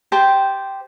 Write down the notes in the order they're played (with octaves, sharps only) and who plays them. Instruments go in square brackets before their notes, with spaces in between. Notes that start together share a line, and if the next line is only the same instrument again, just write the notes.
[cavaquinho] G4 C5 G5 A5